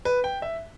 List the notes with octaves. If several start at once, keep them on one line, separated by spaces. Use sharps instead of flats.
B4
G5
E5